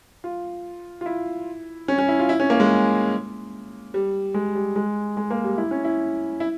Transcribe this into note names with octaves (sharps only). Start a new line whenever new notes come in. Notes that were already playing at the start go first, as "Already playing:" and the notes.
F4
F4
E4
C#4
C#4
E4
F4
E4
C#4
A#3
G#3
G3
G#3
G3
G#3
G#3
A#3
G3
E4
C#4
E4
E4